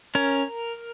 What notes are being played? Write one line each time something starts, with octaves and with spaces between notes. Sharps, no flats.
C#4 A#4